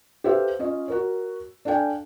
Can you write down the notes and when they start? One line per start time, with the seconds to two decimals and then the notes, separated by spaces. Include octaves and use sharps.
0.24 G4 A4 B4 C5 E5 F5
0.59 C#4 F4 D#5
0.88 F#4 A#4 C#5
1.65 D4 A4 F5 G5 G#5